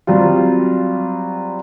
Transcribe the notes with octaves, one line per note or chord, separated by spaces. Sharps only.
F#3 G3 C4 F4